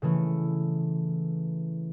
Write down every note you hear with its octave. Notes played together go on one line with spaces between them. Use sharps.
C#3 E3 A3